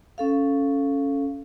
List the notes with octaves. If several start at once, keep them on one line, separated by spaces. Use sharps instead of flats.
C#4 A4 F5